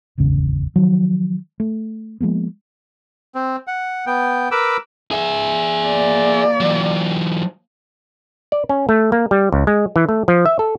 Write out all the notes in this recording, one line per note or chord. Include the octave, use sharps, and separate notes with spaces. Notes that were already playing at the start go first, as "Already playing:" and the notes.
D1 G#1 E2 C#3
D#3 F3 F#3
A3
F3 G#3 A#3 B3
C4
F#5
B3 G5
A#4 B4 B5 D6 E6
G#4 E5
A#3 D5
E3 F#3
D5
C#4
A3
A#3
G3
C#2
G#3
E3
A3
F3
E5
A4